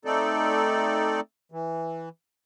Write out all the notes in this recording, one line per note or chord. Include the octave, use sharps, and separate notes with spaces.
A3 C4 D#4 A4 D5
E3